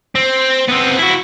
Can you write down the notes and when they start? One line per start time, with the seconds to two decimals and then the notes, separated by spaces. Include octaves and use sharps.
0.15 C4
0.68 B3 C4
0.99 E4 F#4